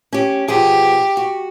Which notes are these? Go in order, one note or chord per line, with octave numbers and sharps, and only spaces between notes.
C#4 G4
B2 F3 G4 G#4
F#4